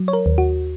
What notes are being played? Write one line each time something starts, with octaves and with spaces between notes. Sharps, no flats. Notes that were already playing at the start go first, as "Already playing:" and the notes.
Already playing: F#3
C#5
A#4
D#2
F#4